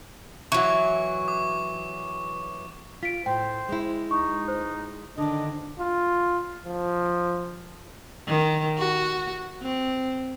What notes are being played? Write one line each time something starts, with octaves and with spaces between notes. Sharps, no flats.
E3 F#3 C#6
D6
F4 B6 D7
A2 C5 G5
G#3 E4
C#2 D#4 C#6
C5
D3 D#3 D4 D#5
F4
F3
D#3
F#4
C4